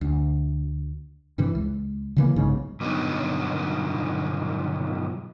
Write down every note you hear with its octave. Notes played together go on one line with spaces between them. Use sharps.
D2
G2 C3 E3
C#2
C#3 E3 A#3
B1 G#2 C#3
G2 B2 D3 F#3 B3 D#4